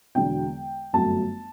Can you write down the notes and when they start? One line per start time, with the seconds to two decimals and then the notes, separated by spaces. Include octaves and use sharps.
0.15 E1 E2 D3 F#3 G5
0.93 G1 F#2 F#3 A3 A5